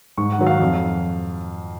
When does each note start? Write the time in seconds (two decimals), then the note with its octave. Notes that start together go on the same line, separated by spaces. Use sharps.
0.18 G#2 C#6
0.32 F#5
0.39 D#3 F#3
0.47 F5
0.61 F2